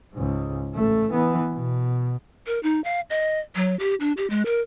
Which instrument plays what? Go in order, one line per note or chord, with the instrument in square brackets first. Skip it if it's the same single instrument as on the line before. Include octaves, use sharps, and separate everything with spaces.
[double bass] C#2 G#2
A1 A3
E3 B3
B2
[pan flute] A#4
D#4
F5
D#5
F#3
G4
D4
G4
G#3
A#4